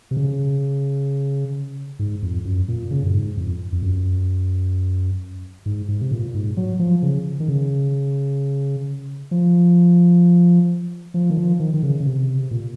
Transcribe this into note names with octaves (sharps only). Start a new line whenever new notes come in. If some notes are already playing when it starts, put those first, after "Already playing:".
C3
C#3
G#2
F2
F#2
A#2
C#3
F#2
G#2
F2
F2
F#2
G#2
G#2
C3
A#2
G#2
F#3
F3
C#3
D#3
C#3
F3
F3
D#3
F3
D#3
D#3
C#3
C#3
C3
A#2